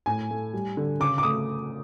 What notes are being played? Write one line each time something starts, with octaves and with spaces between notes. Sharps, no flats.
A2 G#5
A3
G3
D3
C#3 D6
D6
A3 D#6